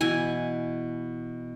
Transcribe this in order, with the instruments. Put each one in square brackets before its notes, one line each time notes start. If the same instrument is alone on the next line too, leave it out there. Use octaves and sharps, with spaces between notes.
[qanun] B2 E3 G#5